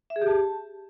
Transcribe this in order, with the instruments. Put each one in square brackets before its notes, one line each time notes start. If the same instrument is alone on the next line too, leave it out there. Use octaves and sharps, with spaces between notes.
[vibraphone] E5
G#4
G4
A5